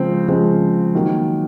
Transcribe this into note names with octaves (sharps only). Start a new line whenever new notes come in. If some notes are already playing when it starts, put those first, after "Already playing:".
Already playing: C#3 F3 G#3 C4
C#3 F3 G#3 C4
D#3 F#3 A#3